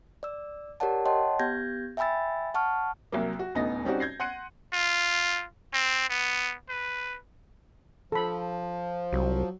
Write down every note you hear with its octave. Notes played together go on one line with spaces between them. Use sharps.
D5 E6
G4 A#4 C#5 D5 F#5 A5
C#5 D#5 F#5 G5 A5 C6
B3 G4 G6 G#6 A#6
E5 G5 G#5 B5 E6 A6
F#5 A5 C#6 F6
C2 F#3 A#3
F#4
D#1 D2 B3 D#4 D#5 A#6
G3 C4 C#4 D#4 F#4 D5
G6 G#6 A#6 C7
F#5 C6 F#6 C#7 D#7
F4
C4
B3
B4
F3 A4 B5
C2 F#3